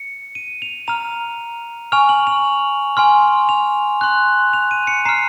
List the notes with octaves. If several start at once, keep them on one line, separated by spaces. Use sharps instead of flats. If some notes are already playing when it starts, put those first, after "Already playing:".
Already playing: C#7
D#7
F7
A#5 F6 F7
G#5 C#6 F6 F7
F#7
F7
G#5 C6 F6
F7
C6 F#6
F7
D#7
C#7
A#5 F6 C7